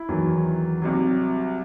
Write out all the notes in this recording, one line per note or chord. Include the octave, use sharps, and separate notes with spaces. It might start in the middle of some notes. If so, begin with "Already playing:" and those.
Already playing: E4
E2 D#3 F#3
C2 C3 F#3